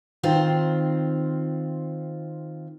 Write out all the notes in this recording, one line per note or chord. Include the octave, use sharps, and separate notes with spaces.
D#3 C4 F4 C5